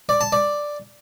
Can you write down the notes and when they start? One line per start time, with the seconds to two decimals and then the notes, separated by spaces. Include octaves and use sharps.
0.09 D5
0.21 A5
0.32 D5